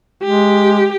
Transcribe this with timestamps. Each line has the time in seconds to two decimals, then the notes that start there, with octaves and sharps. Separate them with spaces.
0.23 G#3 G4